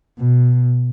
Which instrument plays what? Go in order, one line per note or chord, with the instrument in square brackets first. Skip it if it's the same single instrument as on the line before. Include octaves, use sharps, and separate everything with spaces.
[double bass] B2